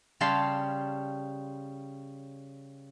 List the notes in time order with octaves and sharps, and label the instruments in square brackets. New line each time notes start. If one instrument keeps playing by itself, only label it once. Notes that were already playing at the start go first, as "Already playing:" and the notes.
[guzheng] C#3 G3 C#5 F5 A5 C6